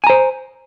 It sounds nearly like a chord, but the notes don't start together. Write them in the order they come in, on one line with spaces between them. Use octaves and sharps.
G#5 A#5 C5